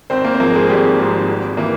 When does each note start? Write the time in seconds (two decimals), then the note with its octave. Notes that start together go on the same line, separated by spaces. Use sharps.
0.10 G#1 C4 C5
0.25 A#3 A#4
0.34 C5
0.40 G#2 F3 G#3 A#3 A#4
0.54 G#3 G#4
0.69 G#1 G3 G4
0.98 G#2 F3 G#3
1.28 G#1
1.57 E3 A#3